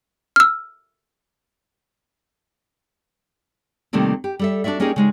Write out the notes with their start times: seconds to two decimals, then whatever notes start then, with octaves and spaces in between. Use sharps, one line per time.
0.36 E6 F6
3.93 C3 D#3 G3 A3 A#3 C4
4.24 G4
4.39 G3 A4 E5
4.64 D4 F4 F#4 D5 E5
4.80 A#3 C#4 D#4 G4 G#4 A#4
4.96 C#3 G#3 D#4